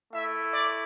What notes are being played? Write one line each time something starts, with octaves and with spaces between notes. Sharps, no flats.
A3 E4 E5
D5